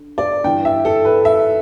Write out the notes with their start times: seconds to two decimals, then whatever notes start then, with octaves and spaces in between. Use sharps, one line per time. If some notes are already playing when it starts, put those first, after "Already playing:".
Already playing: D3
0.18 D5
0.44 G2 E3 G5
0.65 E5
0.85 A4
1.05 B4
1.25 E5